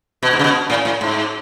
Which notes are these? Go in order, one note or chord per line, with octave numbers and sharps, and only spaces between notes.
B2
G#2
C#3
B2
A2
A2
G#2